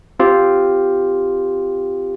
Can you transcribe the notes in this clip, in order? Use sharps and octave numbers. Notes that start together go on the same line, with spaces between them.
C4 F4 G4